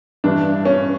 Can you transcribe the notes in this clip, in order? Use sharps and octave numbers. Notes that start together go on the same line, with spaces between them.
G2 E3 D4
C#4